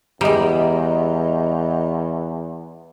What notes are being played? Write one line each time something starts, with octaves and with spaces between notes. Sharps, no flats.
E2 G3 G#3 D#5 A#5